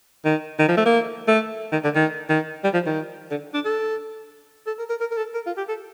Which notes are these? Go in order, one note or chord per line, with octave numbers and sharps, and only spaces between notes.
D#3
D#3
F3
A3
A#3
A3
D#3
D3
D#3
D#3
G3
F3
D#3
D3
D4
A4
A4
A#4
A#4
A#4
A#4
A4
A#4
F4
G4
A4